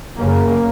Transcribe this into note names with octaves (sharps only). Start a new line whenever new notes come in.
F#2 C#3 A#3